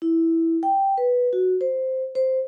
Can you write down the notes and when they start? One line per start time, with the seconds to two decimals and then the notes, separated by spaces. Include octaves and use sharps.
0.02 E4
0.63 G5
0.98 B4
1.33 F#4
1.61 C5
2.15 C5